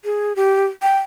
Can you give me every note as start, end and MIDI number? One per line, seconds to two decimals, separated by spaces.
0.05 0.33 68
0.36 0.65 67
0.82 0.98 79